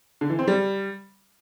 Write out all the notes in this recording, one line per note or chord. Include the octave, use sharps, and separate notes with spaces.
D3
E3
C4
G3